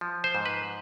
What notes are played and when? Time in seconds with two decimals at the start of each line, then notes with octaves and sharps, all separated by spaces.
0.01 F3
0.24 C5
0.35 G#2
0.46 B4